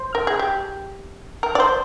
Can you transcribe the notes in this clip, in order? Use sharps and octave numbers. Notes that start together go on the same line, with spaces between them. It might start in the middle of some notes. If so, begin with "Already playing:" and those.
Already playing: C5
A#4
G#4
G4
A#4
D5
C5